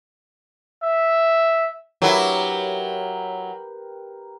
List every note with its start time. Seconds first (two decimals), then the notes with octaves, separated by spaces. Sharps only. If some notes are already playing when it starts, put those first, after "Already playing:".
0.84 E5
2.02 F#3 E4 G4 A#4 B4